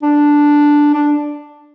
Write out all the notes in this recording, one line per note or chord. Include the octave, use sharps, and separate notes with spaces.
D4
D4